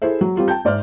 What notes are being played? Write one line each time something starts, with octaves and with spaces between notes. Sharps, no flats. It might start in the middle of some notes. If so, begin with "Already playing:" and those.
E4 G#4 A4 C5 E5
F#3
G3 C4 F4 G4
G5 A5 G6
G#2 D5 E5 F6